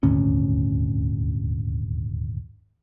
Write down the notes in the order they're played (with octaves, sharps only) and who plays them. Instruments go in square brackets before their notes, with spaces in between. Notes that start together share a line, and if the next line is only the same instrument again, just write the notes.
[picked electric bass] D#1 G#1 D2 C#4